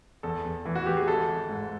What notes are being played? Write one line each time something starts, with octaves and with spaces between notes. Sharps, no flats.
E2 A4
E2
E3
F#4
E3 G4
G#4
G#1 A4
G#1
G#2